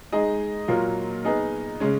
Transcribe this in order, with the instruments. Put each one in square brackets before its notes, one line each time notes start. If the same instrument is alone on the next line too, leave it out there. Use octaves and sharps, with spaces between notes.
[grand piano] G#3 D#4 G#4 D#5
A#2 F#3 A#3 F4
B3 D#4 G#4 D#5
C#3 G#3 C#4